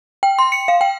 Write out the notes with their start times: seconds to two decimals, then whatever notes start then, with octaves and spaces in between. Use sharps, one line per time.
0.23 G5
0.39 C6
0.52 C#7
0.68 F5
0.81 G5